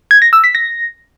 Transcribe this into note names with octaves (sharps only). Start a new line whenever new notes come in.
G#6
A#6
E6
B6
A#6